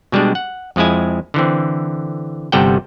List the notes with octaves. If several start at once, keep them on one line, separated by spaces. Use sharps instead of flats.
B2 G3 G#3 D4
F#5
F2 F3 G#3 E4 G#5
D3 E3 C4
G1 C3 G3 A4 F#5 G5